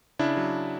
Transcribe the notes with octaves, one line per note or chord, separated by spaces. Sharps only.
C#3 D4 E4
F#3